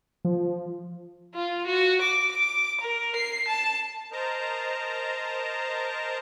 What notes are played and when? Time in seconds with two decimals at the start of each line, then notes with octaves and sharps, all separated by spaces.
0.25 F3
1.35 F4
1.66 F#4
2.01 D6
2.31 D6
2.81 A#4
3.16 C7
3.48 A5
4.12 A#4 C5 D#5 A5 A#5